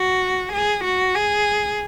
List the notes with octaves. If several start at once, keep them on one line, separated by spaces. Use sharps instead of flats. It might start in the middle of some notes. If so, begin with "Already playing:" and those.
Already playing: F#4
G#4
F#4
G#4